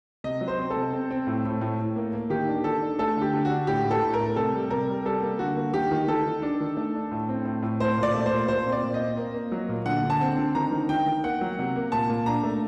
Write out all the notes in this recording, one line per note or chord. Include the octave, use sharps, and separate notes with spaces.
C3 D#5
F#3
C5
C4
A4
C3
C4
C4
A2
A2
A2
A2
A#3
A#3
D#3 G4
D4
D#3 A4
D4
A3 A4
D3 G4
D3
F#4
D4
A2 G4
A2
A4
A2
A#4
A3
C3 A4
G3
C3 A#4
G3
G3 A4
A#3
D3 F#4
A#3
D#3 G4
D#3
D#3 A4
D#3
D4
D#3
A3
D4
A2
C4
A2
A2
A3 C5
A#2 D5
A3
C5
A#2
A#2 C5
C4
D5
A#2
D#5
C4
A#3
A#3
F#3
A#2
D3 F#5
D3
A5
C4
D3
D#3 A#5
D#3
D#3 G5
D#3
A#3 F#5
F#3
C3
A#3
A#2 A5
A#2
D4 A#5
A3